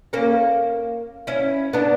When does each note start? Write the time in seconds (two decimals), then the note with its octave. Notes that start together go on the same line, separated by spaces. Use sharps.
0.13 A#3 C#4
1.27 C#4 E4
1.73 B3 D4